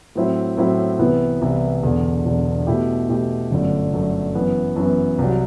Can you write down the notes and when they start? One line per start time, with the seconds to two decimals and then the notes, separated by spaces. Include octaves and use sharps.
0.15 A2 F#3 C4 E4
0.57 A2 F#3 C4 E4
0.99 C2 C3 E3 B3 E4
1.41 C2 C3 E3 B3 E4
1.83 E1 E2 D3
2.25 E1 E2 D3
2.67 B2 A3 E4 G4
3.09 B2 A3 E4 G4
3.51 G1 F#2 D3 A3
3.92 G1 F#2 D3 A3
4.35 F#2 E3 B3
4.76 F#2 E3 B3
5.19 C2 C3 F#3